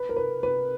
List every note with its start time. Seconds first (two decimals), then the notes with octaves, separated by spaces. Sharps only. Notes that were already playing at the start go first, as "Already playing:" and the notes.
Already playing: B4
0.09 A#4
0.16 B4
0.43 B4